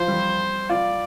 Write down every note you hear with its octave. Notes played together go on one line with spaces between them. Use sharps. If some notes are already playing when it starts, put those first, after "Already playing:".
Already playing: F3 C5
G3
F4 D5